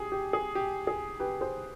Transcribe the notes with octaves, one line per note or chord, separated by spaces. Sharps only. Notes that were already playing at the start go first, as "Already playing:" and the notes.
Already playing: G4 G#4
G4
G#4
G4
G#4
G4 B4
G#4 C5